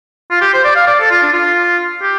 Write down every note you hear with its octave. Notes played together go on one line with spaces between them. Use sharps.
F4
G4
C5
D5
F5
D5
A4
F4
D4
F4
G4